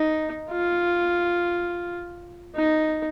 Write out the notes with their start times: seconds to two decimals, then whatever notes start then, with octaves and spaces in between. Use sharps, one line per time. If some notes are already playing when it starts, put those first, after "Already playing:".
Already playing: D#4
0.51 F4
2.56 D#4